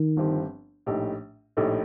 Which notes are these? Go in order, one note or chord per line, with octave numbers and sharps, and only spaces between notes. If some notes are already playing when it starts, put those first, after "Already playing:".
Already playing: D#3
G1 G2 F3 C4 G4
A#1 A2 A3 D#4 G4
A#1 A2 A3 D#4 G4